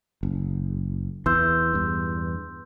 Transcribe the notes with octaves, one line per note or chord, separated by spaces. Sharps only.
F#1
E2 E3 C6 E6 G6
E2 G2